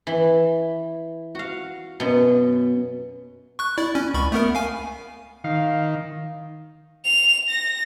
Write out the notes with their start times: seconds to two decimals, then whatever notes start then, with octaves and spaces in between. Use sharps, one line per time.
0.07 E3
1.35 F#4 F5
2.00 F#2 B2
3.59 C#6 F#6
3.78 E4 D5
3.95 C#4
4.14 C#2 B5 C#6
4.32 A3 B3 A#4
4.55 F5 G#5
5.44 D#3 F5
7.05 F7
7.49 A#6